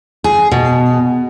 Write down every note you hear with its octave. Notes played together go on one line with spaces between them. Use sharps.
G#4
B2